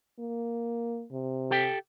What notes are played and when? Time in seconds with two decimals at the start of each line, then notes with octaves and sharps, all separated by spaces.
0.19 A#3
1.11 C3
1.51 G4 A4 G5